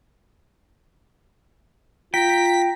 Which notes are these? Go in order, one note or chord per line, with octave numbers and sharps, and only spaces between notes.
F4 G5 A#5 B6